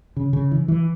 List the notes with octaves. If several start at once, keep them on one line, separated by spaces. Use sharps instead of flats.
C#3
C#3
E3
E3